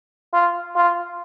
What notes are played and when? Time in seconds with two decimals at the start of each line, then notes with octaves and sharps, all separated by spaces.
0.33 F4
0.76 F4